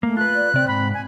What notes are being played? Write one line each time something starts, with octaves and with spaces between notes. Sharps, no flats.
A3 A#3
F4 B4 F#6
D5
C3 C4 D5
G#2 B5
G#5